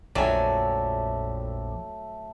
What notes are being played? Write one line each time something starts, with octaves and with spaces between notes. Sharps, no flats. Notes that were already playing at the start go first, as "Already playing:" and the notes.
A#1 F2 F#3 A3 D5 E5 G5 G#5